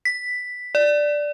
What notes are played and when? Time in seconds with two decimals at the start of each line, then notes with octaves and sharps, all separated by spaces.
0.05 B6
0.75 D5